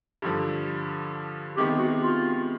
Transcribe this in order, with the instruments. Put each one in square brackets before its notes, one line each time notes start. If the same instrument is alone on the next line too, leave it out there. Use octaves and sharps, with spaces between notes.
[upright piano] G2 D3 F3
[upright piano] C3 D#3 G#3 B3 [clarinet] G4
[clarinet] F#4
F4